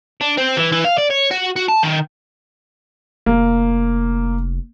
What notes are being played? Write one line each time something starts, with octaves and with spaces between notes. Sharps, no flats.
D4
C4
E3
E3
F5
D5
C#5
F#4
F#4
A5
D#3
F1 A#3